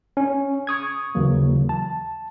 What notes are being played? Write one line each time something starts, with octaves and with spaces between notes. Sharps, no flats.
C#4
C#6 D#6 G#6
D#2 C#3 E3 F#3 A#3
A5